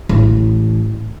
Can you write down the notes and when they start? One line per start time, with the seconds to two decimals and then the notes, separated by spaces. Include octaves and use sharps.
0.09 A1